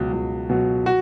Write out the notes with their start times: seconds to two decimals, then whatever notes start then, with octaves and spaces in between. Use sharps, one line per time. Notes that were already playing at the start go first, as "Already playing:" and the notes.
Already playing: C#2 B2 F#3
0.13 C#2
0.50 B2 F#3
0.86 F#4